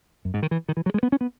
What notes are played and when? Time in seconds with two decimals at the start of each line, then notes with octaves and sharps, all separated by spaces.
0.25 F#2
0.34 G#2
0.43 D#3
0.51 E3
0.69 D#3
0.77 E3
0.86 F#3
0.94 G#3
1.03 B3
1.12 C#4
1.21 B3